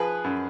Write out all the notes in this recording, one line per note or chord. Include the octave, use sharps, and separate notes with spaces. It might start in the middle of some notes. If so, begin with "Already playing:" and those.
Already playing: F3 G#4 B4
F#2